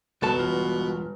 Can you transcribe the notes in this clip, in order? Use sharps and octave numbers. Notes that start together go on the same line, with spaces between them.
G1 C2 F2 B2 A4 A5
E1 F4